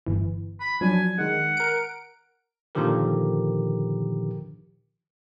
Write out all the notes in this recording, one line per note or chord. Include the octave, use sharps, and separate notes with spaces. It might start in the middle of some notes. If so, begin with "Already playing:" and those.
G1 E3
B5
F3 F#3 D4 G#5
D#3 G#3 F#5
A#4 D7
A#2 D3 D#3 F3 G4 A#4